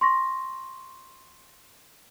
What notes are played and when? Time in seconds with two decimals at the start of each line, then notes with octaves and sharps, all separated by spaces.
0.01 C6 C#6 A#6